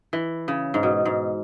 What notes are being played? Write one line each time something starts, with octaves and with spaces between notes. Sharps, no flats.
E3
C#3
G#2
B2
G#2